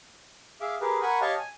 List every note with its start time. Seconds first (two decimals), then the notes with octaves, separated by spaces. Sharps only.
0.61 G#4 E5 F5 D6
0.81 G4 G#4 A#4 B4
1.02 A#4 F#5 G#5 B5 C#6
1.21 G4 C#5 D#5 F5 A5 C#6
1.39 G#5